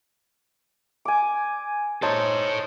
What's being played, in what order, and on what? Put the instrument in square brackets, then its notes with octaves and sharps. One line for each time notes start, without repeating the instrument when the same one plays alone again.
[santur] G#5 D6
[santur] D#4 C5 A5 [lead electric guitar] A4 C#5